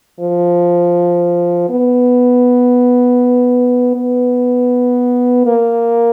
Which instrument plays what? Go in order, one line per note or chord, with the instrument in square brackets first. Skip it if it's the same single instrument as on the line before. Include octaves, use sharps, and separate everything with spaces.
[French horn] F3
B3
B3
A#3